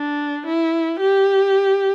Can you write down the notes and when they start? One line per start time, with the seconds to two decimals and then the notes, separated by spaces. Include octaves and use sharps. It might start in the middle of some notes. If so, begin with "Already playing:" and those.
Already playing: D4
0.46 E4
1.00 G4